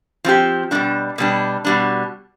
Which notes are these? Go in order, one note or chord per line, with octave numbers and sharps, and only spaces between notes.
F3 C4 G4
B2 G3 D4
B2 G3 D4
B2 G3 D4